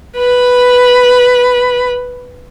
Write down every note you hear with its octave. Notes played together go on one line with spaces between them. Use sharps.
B4 B5